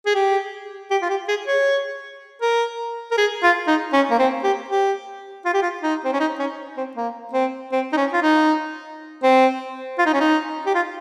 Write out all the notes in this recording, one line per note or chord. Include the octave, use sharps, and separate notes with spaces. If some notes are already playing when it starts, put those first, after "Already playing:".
G#4
G4
G4
F4
G4
G#4
C#5
A#4
A#4
G#4
F4
D#4
C#4
A#3
C4
G4
G4
F4
G4
F4
D#4
C4
C#4
D#4
C#4
C4
A#3
C4
C4
D#4
C#4
F4
D#4
C4
F4
D#4
C#4
D#4
G4
F4